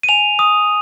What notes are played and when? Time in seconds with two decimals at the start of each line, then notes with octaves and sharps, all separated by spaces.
0.03 D#7
0.09 G#5 F7
0.39 D#6